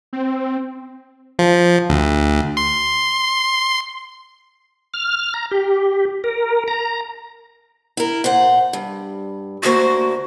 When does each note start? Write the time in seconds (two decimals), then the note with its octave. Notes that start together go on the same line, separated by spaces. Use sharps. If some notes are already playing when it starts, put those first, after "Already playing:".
0.13 C4
1.39 F3
1.90 D2
2.57 C6
4.94 F6
5.34 A#5
5.51 G4
6.24 A#4
6.68 A#5
7.97 E4 A#4
8.24 A#2 C5 F#5
8.73 G2
9.63 D2 A#3 F#4 C5